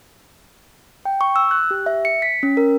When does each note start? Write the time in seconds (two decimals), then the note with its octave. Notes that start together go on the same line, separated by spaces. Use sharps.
1.05 G5
1.21 C#6
1.36 E6
1.51 F#6
1.71 G4
1.86 E5
2.05 C#7
2.22 B6
2.43 C#4
2.57 A#4